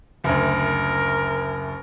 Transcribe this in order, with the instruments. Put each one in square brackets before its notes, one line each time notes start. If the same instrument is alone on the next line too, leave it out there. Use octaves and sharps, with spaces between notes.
[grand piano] F#1 D2 [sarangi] A#4